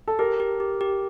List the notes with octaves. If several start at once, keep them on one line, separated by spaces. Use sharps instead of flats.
A4
G4 A#4
G4
G4
G4